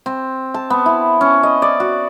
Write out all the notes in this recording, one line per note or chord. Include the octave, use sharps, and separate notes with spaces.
C4
A5
B3
E4
C#4
D#5
D5
F#4